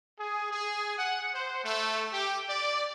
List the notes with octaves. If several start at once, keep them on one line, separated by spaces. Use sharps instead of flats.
G#4
G#4
F#5
C5
A3
G4
D5